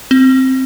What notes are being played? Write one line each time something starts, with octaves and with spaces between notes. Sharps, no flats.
C4